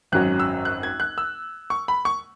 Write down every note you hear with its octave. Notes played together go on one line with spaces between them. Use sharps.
G#1 F#2 F#3 C#4 F#6
E6
F#6
G#6
F#6
E6
C#6
B5
C#6